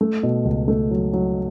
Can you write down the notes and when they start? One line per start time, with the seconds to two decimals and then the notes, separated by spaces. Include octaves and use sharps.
0.01 A3
0.23 B2
0.45 C#2
0.68 A3
0.91 F#3
1.13 F#3